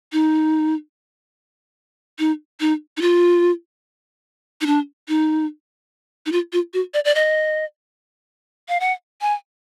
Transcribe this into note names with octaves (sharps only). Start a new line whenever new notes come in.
D#4
D#4
D#4
D#4
F4
D#4
D4
D#4
D#4
F4
F4
F#4
D5
D5
D#5
F5
F#5
G#5